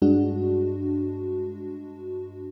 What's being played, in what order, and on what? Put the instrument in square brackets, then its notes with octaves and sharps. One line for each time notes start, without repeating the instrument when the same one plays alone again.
[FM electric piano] G2 G#3 D4 F#4